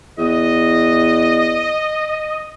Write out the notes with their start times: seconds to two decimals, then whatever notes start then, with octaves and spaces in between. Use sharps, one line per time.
0.18 E2 D#5